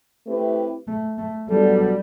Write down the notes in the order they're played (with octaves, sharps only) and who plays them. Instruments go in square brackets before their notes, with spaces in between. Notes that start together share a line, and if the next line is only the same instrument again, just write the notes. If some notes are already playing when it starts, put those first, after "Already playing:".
[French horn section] A3 C4 E4 G4 B4
[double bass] A3
A3
[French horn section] F#3 B3 D4 A4 [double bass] G3